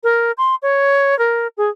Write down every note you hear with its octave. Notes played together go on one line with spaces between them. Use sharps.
A#4
C6
C#5
A#4
G#4